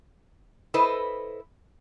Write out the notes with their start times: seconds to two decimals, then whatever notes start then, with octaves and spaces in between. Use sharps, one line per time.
0.74 E4 A4 B4 C5 D#5